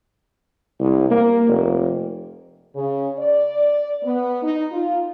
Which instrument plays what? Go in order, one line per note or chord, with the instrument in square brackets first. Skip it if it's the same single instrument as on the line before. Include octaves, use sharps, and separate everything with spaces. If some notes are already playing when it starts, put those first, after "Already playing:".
[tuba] C2
A#3
F1
[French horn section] C#3
D5
B3
D#4
F4